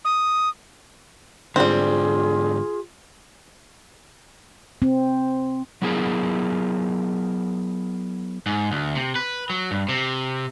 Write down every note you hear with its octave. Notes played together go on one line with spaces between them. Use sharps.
D#6
G#2 D3 G3 C4 F4 G#4
C4
F#3 B3 E4 G4 G#4 A#4
G#2
D2
C3
B4
F#3
G2
C3